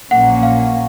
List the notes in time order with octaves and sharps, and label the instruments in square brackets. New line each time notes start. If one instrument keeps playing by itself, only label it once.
[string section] A#1 A#2 F#3 A#3 C#4 [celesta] F#5
[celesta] F5